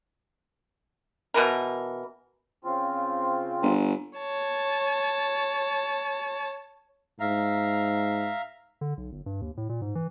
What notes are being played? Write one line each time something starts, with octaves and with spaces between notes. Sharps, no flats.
B2 E3 A#4
C#3 C4 F4
G1
C#5 A5
G#2 E5 F5 A#5
D3
B1
G1
G2
D#2
A2
A#2
G#2
E3